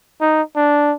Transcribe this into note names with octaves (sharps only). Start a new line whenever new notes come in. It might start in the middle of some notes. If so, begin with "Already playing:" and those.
D#4
D4